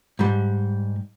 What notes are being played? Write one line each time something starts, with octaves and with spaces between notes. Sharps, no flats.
G#2 G3